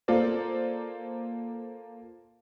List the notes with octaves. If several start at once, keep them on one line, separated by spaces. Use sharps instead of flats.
A#3 F4 A4 C5 D5